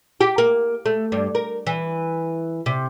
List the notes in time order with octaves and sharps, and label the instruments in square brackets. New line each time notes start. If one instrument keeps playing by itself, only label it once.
[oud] G4
A#3
A3
G2
A#4
E3
C3